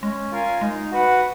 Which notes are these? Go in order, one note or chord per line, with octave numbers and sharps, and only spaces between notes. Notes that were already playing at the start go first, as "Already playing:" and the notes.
G#3 C#4
F4 A#4 F5 G#5
G#3 D#4
F#4 B4 F#5